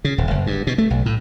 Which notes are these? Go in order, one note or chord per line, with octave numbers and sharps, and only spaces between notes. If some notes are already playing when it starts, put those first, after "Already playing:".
C#3
D#1
F#1
G2
B2
A3
B1
A2